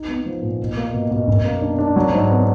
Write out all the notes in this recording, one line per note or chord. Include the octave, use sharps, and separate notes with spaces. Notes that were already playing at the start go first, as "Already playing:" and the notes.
Already playing: D#4
B3
F3
A#2
B2
A#3
B2
B2
F#2
A#3
D4
D4
F#3
G#2
B3